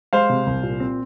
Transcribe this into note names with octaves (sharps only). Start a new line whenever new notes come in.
G#3 C5 F5
C3
C2
A#2
C4